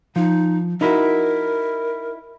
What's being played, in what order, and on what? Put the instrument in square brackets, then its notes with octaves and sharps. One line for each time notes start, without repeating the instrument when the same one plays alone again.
[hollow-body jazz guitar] F3 [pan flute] D#4
[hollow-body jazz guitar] D#4 E4 F#4 [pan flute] A#4